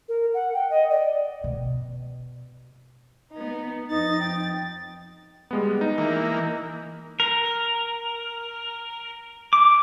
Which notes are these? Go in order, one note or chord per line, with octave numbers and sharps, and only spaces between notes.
A#4
F#5
G5
D#5
D5
B2
B3 D#4
F2 D#4 A6
G5
G3 G#3 B3
D#4
E3 A#3
A#4
D6